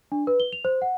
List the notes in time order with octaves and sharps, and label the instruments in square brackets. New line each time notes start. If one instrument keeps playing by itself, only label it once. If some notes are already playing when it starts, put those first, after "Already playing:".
[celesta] D4
B4
G7
F7
C5
F#5